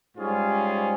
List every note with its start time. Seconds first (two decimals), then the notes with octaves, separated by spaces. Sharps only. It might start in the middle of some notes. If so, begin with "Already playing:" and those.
0.17 G#2 G3 C#4 F4 G#4